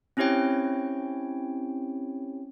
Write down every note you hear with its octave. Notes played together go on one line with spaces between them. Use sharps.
C4 C#4 E4 G4 C#5 G5